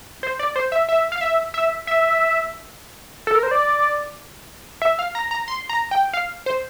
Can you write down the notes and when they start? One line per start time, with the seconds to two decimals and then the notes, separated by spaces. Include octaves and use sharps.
0.23 C5
0.39 D5
0.56 C5
0.72 E5
0.89 E5
1.12 F5
1.21 E5
1.54 E5
1.87 E5
3.27 A4
3.35 A#4
3.43 C5
3.51 D5
4.82 E5
4.99 F5
5.15 A#5
5.31 A#5
5.48 C6
5.69 A#5
5.91 G5
6.13 F5
6.46 C5